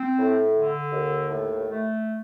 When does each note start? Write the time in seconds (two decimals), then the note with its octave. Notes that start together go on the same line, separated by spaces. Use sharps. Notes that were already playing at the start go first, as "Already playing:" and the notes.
Already playing: C4
0.17 A2
0.54 D3
0.91 D#2
1.28 A2
1.66 A3